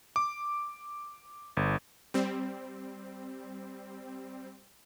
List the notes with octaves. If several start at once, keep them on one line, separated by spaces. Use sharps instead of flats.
D6
G1
G3 C4